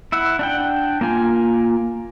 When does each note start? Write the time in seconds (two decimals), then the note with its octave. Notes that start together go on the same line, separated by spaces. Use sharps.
0.12 E4 E5 F#5
0.39 D4 F#5 G5
1.01 A#3 F4 G#5